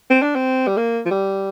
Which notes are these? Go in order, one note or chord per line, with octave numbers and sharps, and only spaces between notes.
C4
D4
C4
G3
A#3
F3
G3